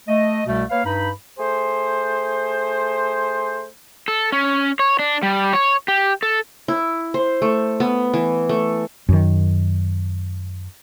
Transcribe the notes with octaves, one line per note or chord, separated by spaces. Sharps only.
A3 D#5
C2 B2 G3 A3
A#3 B4 C#5 F5
G2 D#4 B5
A3 G#4 C5
A4
C#4
C#5
D4
G3
C#5
G4
A4
E4
C5
A3
B3
E3
A3
F#2 D#3